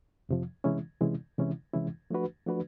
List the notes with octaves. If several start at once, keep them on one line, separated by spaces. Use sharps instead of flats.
F2 C3 F3
C3 E3 G#3 C#4 E4
C3 E3 G#3 C#4 E4
C3 E3 G#3 C#4 E4
C3 E3 G#3 C#4 E4
F3 A3 D4 F#4 B4
F3 A3 D4 F#4 B4